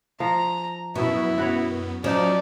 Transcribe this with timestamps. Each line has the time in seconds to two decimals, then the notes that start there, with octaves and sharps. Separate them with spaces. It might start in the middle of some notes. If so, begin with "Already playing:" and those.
0.20 F3 A#5
0.95 F#2 B2 B3 E4
1.38 F#4 B4 C#5
2.04 F3 F#3 C#4 D#4 C#5 D5